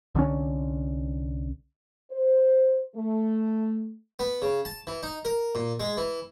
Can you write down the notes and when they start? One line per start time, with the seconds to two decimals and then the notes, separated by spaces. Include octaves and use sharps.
0.15 C2 D3 F#3 C#4
2.11 C5
2.96 A3
4.19 B3
4.42 C#3
4.65 A5
4.87 E3
5.03 D#4
5.25 A#4
5.55 A#2
5.80 G#3
5.97 E3